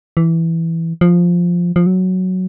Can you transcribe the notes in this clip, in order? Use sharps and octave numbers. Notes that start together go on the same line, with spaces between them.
E3
F3
F3
F#3